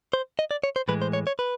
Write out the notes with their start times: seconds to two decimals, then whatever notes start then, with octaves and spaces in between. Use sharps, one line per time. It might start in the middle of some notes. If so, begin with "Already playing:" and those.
0.13 C5
0.39 D#5
0.51 D5
0.64 C#5
0.76 C5
0.88 A2 E3 G#3 B4
1.02 C5
1.13 C#5
1.27 C#5
1.39 B4